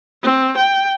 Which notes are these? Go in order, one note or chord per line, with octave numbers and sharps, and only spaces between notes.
C4
G5